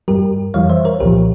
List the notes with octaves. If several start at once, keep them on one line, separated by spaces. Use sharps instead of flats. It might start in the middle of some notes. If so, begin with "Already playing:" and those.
G2 G3 G4 A#4
F2 E3 G3 C#5 F5
C5 E5
A#4 C#5
C2 A#2 F3 G4 A#4